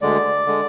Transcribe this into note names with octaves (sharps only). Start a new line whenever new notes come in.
D2 D3 G#3 D5
D3 G#3